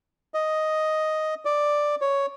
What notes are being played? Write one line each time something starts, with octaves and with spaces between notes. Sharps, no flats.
D#5
D5
C#5